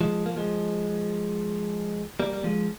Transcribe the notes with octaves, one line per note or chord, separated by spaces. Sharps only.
F3 G#3
A#3
F3 G#3
G3 A#3
G3
F3 G#3